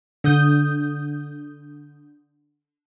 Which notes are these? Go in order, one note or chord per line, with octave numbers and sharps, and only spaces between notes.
D3 D#6 G6